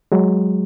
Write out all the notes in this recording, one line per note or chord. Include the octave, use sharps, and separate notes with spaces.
F#3 G#3